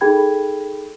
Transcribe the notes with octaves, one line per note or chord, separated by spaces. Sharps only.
D#4 G#4 A4 G5 B5 G#6